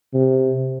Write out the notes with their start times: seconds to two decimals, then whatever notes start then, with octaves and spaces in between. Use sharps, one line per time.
0.14 C3